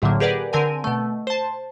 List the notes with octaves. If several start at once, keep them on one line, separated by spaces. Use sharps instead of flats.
A#1 A2 D3 F#3 A#3
G4 G#4 A#4 B4 D5 F#5
D3 C4 A#4 G#5 D#7
B2 A3
C5 A5